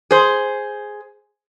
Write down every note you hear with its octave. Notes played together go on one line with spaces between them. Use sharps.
G#4 C5